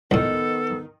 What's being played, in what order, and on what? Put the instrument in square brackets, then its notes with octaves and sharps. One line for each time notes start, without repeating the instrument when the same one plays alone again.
[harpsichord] C#2 A2 [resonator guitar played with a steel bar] D#3 [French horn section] B3 [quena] A4